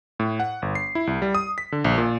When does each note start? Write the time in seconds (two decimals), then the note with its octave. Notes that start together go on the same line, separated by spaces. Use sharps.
0.20 A2
0.40 F#5
0.62 G1
0.75 C7
0.95 E4
1.07 C2
1.22 G3
1.35 D#6
1.58 B6
1.72 D3
1.85 A#1
1.98 A#2